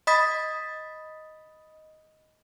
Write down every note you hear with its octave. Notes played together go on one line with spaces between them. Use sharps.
D#5 B5 D#6 A6 B6